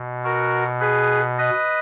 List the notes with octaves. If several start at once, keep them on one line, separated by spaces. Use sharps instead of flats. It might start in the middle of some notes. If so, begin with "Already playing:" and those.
Already playing: B2
F#4 A#4
G#4 B4
B4 D#5